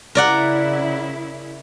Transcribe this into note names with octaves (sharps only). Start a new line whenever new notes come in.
C#3 E4 A#4 D5 F#5